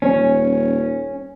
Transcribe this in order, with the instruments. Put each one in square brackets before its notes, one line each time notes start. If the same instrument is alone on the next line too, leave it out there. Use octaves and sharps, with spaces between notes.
[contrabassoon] D#1 [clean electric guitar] C#4